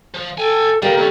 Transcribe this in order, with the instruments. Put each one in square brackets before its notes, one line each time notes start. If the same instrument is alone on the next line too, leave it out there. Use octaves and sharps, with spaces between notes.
[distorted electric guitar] F3
[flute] A4 [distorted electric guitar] G5 G#5
[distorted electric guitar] C#3 A#3 [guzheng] G3 [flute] A#4
[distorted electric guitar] C#2 C#4 [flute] A4